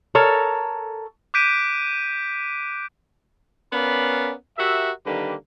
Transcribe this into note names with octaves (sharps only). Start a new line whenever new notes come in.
A4 A#4 C#5
D6 F#6 G6 B6 D7 D#7
B3 C#4 A#4 D5 F5 B5
F#4 G4 A#4 E5
D3 D#3 G3 A#3 G4 B4